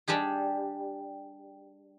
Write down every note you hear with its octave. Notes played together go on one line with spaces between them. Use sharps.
G3 D4 G4 G#4